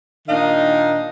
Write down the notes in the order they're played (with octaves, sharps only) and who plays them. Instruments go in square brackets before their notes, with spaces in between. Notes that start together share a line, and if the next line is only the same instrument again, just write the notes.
[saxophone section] A#2 D#3 D4 D#4 D#5 F5